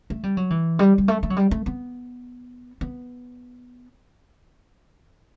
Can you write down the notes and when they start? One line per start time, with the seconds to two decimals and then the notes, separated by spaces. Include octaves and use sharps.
0.10 A3
0.23 G3
0.37 F#3
0.50 E3
0.79 G3
0.98 G3
1.08 A3
1.23 A3
1.30 F#3
1.37 G3
1.51 A3
1.66 B3
2.81 B3